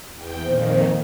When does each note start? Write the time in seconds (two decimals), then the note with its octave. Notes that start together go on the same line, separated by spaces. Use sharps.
0.14 E2 G5
0.45 F2 A#2 D#3 C5